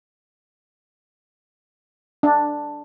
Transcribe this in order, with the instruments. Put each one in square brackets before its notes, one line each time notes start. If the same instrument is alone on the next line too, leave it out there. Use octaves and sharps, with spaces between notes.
[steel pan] D4